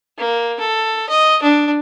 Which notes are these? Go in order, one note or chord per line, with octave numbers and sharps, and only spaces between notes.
A#3
A4
D#5
D4